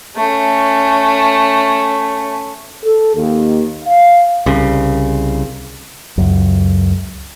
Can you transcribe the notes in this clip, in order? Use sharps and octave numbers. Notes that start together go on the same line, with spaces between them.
A3 C#4
A4
D#2
F5
C2 C#3
C#2 F#2